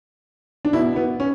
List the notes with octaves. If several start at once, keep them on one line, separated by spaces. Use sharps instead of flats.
D4
B2 E4
B3
C#4